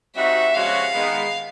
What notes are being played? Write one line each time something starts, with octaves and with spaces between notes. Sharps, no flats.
G3 C4 D#4 F#4 E5
C3 F3 G#3 C#4 F#4 F5
D#3 G#3 B3